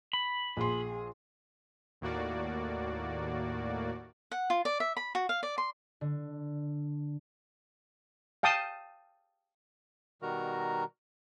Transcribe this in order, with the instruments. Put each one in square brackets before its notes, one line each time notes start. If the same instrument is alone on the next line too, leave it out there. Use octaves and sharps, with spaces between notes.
[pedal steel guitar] B5
[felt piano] A#1 C6 [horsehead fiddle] G#4
[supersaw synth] D#2 A2 A#3 F#4 D5
[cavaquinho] F#5
F4
D5
E5
B5
F#4
F5
D5
C6
[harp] D3
[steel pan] F5 G5 A5 D#6
[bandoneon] B2 D#3 G3 F#4 A#4 A#5